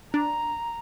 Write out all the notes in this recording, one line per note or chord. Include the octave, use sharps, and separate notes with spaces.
D4 A#5